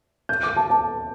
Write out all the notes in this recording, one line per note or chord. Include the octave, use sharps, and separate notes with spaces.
G6
D6
A5
A5